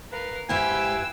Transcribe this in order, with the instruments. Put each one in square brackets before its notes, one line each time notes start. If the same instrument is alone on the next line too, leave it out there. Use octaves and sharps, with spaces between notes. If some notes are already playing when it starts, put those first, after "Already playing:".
[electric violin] A#4 F5 [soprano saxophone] B4
[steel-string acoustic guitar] G#2 G4 [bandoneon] E4 B4 F5 [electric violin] G5 E6 [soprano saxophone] G#5